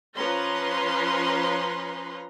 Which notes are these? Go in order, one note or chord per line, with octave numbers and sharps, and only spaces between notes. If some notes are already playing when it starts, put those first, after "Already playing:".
F3 C#4 B4 A#5 C6